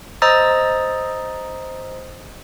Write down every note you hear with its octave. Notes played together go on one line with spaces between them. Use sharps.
C5 D#5 A#5 D#6 E6 A6